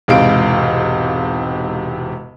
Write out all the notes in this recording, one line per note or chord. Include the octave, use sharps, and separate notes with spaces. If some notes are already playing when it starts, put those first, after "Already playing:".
E1 G#2 C3 F5 D7